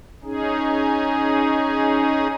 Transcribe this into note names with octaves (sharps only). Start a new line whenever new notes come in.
C#4 D#4 G#4